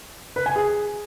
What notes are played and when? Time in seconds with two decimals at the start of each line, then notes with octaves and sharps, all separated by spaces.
0.36 B4
0.46 G#5
0.56 G#4